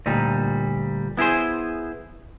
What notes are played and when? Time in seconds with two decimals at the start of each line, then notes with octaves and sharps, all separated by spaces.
0.06 D2 A#2 G3 D#4
1.17 B3 E4 G4 G#4 C5